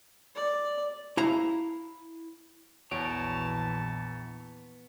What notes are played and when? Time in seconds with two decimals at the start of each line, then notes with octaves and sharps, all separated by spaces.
0.35 D5
1.17 E4 F5 A#5
2.91 A#1 E2 E3 B3 F#4 C#5 A5 D7